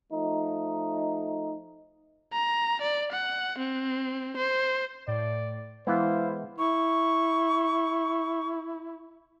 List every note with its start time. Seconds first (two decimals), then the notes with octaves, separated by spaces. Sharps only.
0.12 F3 A3 D#4
2.33 A#5
2.81 D5
3.12 F#5
3.58 C4
4.37 C5
5.08 A2 D5
5.87 E3 G#3 B3 E4 C5 F5
6.58 E4 C#6